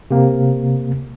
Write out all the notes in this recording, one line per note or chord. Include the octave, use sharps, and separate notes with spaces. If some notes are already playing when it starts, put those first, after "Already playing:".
C3 A#3